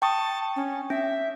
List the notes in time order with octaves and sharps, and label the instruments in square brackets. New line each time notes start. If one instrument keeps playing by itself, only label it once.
[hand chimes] G5 C#6 D#6 [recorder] A5
[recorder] C#4
[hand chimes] C#4 [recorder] E5